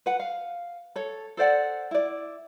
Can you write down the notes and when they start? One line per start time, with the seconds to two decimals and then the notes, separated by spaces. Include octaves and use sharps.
0.06 B4 F#5
0.20 F5
0.96 A4 C#5
1.37 A4 C5 D5 F#5
1.91 E4 D5